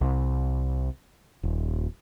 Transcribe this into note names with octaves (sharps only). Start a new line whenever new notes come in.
C2
D#1